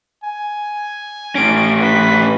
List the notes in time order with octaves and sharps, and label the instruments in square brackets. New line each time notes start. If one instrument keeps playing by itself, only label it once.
[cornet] G#5
[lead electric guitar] A2 C#4 [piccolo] D7
[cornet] B4 [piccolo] B6